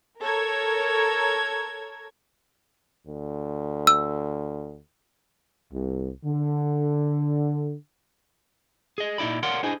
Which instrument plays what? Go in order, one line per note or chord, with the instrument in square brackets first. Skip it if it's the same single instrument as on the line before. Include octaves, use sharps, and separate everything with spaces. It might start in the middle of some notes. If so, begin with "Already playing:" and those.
[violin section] A4 A#4 C#5 A#5 G#6
[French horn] D2
[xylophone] E6
[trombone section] C2
D3
[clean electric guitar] G#4 D#5
A#2 D#4 E4 D5 B5
A#4 C#5 D5 F5 F#5 C6
D4 E4 G#4 C5 D#5 G#5